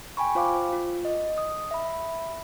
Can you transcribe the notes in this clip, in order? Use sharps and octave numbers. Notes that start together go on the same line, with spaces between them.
G5 G#5 B5 C#6
F4 C5 F5 D6
F4
D#5
D#6
E5 B5